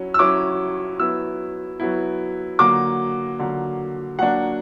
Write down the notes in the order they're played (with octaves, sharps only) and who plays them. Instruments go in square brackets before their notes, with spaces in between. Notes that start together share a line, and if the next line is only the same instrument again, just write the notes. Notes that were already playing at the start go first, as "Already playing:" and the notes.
Already playing: [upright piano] F#3 C#4 E4
E6
F#3 C#4 E4 D6
F#3 B3 E4 E6
F#3 B3 E4
D3 F#3 A#3 D6
D3 F#3 A#3
F#3 A#3 D4 F#5